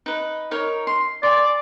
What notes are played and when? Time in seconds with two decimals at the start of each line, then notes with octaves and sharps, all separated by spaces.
0.06 D#4 B4
0.51 D#4 A#4 C#5
0.87 C6
1.23 D5 G#5 C6